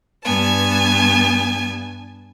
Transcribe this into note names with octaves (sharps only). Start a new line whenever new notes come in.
G2 B3 G#5 A5